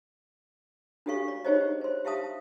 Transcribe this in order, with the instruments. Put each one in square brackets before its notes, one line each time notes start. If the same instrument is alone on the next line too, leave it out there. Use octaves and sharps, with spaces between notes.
[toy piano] D4 F#4 G4 A4 F5 C#6
D5
D#4 G4 G#4 C5 C#5 D#5
C5 C6
G4 E5 F5 A5 D#6